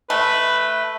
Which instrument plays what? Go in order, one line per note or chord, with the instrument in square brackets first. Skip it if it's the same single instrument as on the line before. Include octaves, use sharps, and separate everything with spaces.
[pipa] A3 [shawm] B4